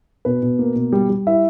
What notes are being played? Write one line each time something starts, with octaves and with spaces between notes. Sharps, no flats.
B2 B4
B2
A#3
B2
G3
G3
E4 E5